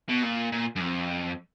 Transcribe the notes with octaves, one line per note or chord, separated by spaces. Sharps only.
B2
A#2
A#2
F#2
F2